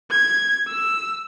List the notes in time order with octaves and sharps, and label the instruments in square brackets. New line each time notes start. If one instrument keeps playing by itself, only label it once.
[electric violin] G#6
E6